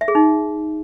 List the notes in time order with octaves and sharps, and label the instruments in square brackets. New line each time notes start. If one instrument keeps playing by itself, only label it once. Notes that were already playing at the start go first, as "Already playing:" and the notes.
[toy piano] E5
G#4
D#4